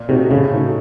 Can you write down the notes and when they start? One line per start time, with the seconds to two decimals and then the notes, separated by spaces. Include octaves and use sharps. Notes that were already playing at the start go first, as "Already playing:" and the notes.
Already playing: A#2
0.09 C3 A3 D#4 F#4
0.31 A2 C#3
0.52 A3 D#4 F#4